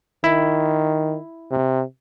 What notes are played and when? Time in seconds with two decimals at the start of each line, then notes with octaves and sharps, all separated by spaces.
0.24 D#3 E4
1.51 C3